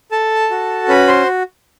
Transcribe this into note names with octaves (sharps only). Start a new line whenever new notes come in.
A4 A5
F#4
C#4 B4 B5
C5 C6